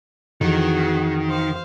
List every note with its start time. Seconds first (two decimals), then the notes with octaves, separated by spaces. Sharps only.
0.41 F2 D#3 E3 F#4 G#4
1.29 C5 F5